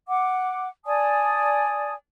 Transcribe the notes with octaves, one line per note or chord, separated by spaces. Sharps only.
F#5 D6
D5 G#5 A5 D#6